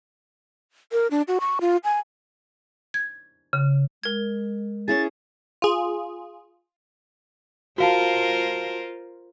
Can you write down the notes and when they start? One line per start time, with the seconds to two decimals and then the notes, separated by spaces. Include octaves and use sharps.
0.92 A#4
1.11 D4
1.28 F#4
1.41 C#6
1.61 F4
1.84 G#5
2.94 G#6
3.53 C#3
4.03 G#3 A#4 G#6
4.88 C#4 E4 G#4 A6
5.62 F4 G#4
7.78 F4 F#4 A#4 C5 F5 A5